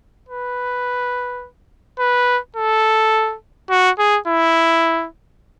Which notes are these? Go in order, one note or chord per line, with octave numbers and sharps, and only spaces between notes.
B4
B4
A4
F#4
G#4
E4